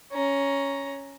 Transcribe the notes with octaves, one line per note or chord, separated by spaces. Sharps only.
C#4 A#5